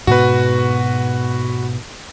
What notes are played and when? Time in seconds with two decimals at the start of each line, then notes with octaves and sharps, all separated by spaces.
0.07 G#2 B2 B3 F#4 B4